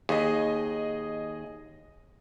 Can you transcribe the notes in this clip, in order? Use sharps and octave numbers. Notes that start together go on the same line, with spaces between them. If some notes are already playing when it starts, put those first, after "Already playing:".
D#2 G#4 D#5